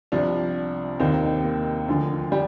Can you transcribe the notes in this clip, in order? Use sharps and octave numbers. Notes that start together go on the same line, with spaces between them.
C2 C3 F3 D4
D#2 D#3 C4
A#3
D2 D3 F3
G3